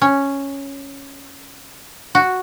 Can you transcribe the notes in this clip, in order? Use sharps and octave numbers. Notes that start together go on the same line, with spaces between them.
C#4
F#4